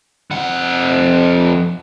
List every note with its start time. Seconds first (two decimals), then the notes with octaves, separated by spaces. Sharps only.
0.31 F2 F#5